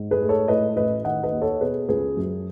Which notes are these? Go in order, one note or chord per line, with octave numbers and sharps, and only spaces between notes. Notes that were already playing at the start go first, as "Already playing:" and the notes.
Already playing: G#2
G#4 B4
A3
A4 C#5
A2 B4 D#5
A1 B4 D#5
D#3 D#5 F#5
B4 D#5
D#2
A4 C#5
B2 G#4 B4
C#2 G#4 B4
F#2